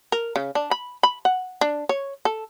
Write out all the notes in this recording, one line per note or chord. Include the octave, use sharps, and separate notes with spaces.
A#4
C#3
D4
B5
B5
F#5
D4
C#5
A4